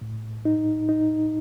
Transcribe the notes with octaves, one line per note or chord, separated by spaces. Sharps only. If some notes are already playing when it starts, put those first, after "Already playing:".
A2
D#4
D#4